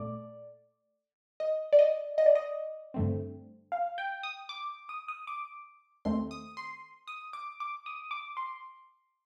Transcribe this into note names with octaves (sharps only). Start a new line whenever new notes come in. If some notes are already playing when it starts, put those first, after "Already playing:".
Already playing: A#2 A3 D5
D#5
D5
D#5
D#5
D5
D#5
G2 D3 A3 C4
F5
G5
D#6
D6
D#6
D#6
D6
D#2 D#3 A3 C4 C6
D#6
C6
D#6
D6
D6
D#6
D6
C6